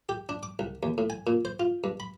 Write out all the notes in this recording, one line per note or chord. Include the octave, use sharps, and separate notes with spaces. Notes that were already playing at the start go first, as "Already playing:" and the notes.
G4
D4
D6
C2
D#2
A2
G#5
A#2
C5
F4
G2
B5